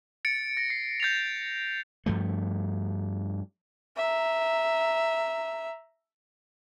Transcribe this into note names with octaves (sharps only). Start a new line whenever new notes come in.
A6 C#7 D7
A#6
C7
G6 A6 C7 F7
G2 F3 A3
E5 A#5